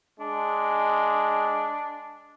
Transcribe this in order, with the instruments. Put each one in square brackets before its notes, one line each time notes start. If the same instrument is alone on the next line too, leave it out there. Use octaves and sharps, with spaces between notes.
[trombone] G#3 [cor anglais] D4